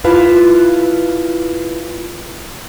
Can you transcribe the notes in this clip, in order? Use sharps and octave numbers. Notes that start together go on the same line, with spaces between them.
E4 F4 B4 A5